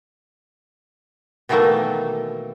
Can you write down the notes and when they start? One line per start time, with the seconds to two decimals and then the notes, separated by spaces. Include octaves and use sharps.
1.49 B2 D#3 E3 F#3 A3 A#3